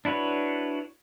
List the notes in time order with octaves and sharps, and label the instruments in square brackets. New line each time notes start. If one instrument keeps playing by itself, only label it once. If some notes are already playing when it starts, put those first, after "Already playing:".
[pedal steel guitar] D4 E4 F#4 B4 C#5